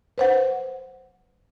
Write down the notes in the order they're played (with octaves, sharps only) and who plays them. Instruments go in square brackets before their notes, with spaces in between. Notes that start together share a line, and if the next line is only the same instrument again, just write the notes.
[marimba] B4 C5 F#5